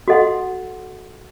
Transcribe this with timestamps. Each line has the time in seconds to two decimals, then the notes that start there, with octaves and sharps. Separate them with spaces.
0.08 F#4 A4 D#5 F#5 C6